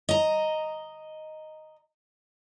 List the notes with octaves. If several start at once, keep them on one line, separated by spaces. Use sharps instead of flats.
D#5 A#5